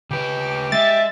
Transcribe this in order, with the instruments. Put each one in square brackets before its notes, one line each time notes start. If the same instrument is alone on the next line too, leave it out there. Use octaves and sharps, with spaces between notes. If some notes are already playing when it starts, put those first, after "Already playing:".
[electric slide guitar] C#3 B4 [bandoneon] G4 G5 D6
[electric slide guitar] G#3 [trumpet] E5 [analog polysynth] A6